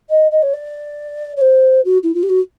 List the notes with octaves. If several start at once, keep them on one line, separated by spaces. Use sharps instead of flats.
D#5
D#5
C#5
D5
C#5
C5
F#4
E4
F4
G4
F#4